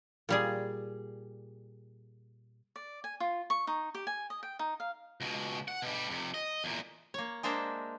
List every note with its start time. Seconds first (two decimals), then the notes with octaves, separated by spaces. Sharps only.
0.29 A#2 G3 G#4
2.76 D5
3.04 G#5
3.20 F4
3.50 C#6
3.67 D#4
3.95 G4
4.07 G#5
4.30 D#5
4.43 G5
4.59 D#4
4.80 F5
5.21 C#2 B2
5.68 F#5
5.82 B2 G3
6.09 F2 C3
6.34 D#5
6.64 E2 A#2
7.14 A#3 C#5
7.43 G#3 A#3 D4 A#4 C5 E5